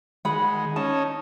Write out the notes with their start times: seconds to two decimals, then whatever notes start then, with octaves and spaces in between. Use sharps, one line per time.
0.25 D#3 G#3 F#5 B5
0.76 C#4 D#4 A5